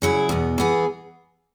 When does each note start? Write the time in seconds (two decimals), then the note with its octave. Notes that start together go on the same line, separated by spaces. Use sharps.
0.02 C#3 F#3 E4 G#4
0.29 E2 B2 B3
0.58 E3 B3 G#4